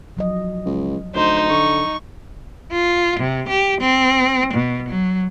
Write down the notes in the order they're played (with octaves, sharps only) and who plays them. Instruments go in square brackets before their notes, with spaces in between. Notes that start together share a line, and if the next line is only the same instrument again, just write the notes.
[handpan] F3 F#3 D#5
[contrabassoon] C#2
[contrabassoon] D2 [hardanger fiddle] D#4 [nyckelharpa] C5
[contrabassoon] D3 [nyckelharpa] C#6
[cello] F4
C3
G4
C4
B2
F#3